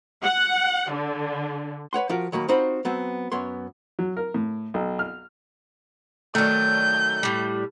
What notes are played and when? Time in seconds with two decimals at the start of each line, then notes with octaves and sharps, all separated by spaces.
0.23 F#5
0.93 D3
1.93 B4 C#5 F#5 C6
2.09 F3 F4 F#4 A#4
2.32 D#3 F#3 A#3 B5
2.48 C4 D#4 F4 F#4 C5 B5
2.85 F#3 B3 C4
3.32 F#2 B3 C#5 C6
3.99 F#3
4.17 A#4
4.34 A2
4.74 B1
4.99 F6
6.35 D#3 F#3 A3 D5 G6
7.23 A2 G3